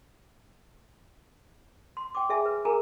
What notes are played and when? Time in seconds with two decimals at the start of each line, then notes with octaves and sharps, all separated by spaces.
1.97 C6
2.15 G5 D6
2.29 G#4 E5 G#5
2.45 B4
2.65 G#4 A#4 G#5 A#5